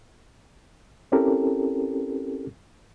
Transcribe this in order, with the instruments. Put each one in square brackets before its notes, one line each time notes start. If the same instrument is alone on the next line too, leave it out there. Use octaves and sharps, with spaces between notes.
[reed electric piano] C4 C#4 E4 G4 A4 A#4